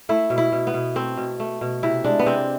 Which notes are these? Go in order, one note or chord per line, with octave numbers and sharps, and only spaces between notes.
A3 E4
B2
E4
B2
B3
B2
A3 C4
B2
A3
B2
C3 E4
G#3 D4
B3
C3 C4